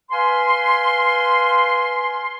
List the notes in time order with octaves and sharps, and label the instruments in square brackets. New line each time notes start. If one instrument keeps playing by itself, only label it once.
[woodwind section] B4 F5 G#5 C6